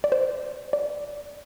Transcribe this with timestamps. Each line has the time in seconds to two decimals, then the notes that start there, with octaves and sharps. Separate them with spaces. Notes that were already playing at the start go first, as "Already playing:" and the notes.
0.04 D5
0.12 C5
0.73 D5